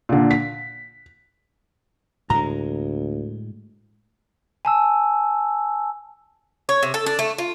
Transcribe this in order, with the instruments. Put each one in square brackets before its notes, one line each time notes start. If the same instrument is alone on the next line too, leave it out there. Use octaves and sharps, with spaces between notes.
[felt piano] A#2 D3
B6
[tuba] D2 [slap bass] A2 G#3 [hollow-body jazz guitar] A#5
[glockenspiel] G#5 A5 E6
[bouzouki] C#5
C3
A4
D4
A3
F4